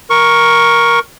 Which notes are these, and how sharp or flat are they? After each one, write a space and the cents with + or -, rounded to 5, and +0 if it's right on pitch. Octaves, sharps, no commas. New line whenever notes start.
A#4 +10 C#6 +0